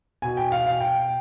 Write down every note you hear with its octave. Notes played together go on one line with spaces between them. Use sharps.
B2 G#5
G5
F5
F5
G5